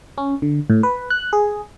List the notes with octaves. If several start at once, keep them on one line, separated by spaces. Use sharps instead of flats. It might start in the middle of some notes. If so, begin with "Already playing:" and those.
C#4
D3
A2
B4
F#6
G#4